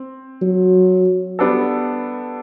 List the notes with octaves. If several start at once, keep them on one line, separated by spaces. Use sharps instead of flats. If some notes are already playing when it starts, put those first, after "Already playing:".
Already playing: C4
F#3
G3 B3 D4 A4